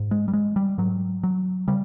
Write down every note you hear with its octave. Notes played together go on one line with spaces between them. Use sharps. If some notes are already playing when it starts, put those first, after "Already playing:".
Already playing: G#2
G#3
G3
G#3
G3
G#2 F#3
F#3
C#3 G3